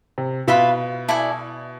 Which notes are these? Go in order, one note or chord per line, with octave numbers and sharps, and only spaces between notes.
C3
B2 F4 B4 E5 B5
E4 A4 D5 G#5